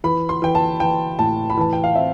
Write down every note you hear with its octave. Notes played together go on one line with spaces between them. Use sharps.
E3 B5
C6
E3 G5
A5
E3 G5
A2 A5
B5
E3 A5
G5
F5
C4 E5